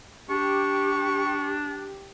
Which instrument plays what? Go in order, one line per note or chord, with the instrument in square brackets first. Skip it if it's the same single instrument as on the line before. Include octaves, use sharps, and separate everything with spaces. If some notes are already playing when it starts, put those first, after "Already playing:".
[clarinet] D4 [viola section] G4 [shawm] C#6